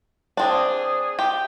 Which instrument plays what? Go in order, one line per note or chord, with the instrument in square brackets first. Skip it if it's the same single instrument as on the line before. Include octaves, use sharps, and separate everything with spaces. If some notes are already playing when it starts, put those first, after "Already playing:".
[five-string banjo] C4 D4 [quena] G#4
[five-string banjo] G4